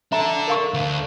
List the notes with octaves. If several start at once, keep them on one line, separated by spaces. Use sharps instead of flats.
D4 A4 E5 A#5
A#4 F5 C#6
D2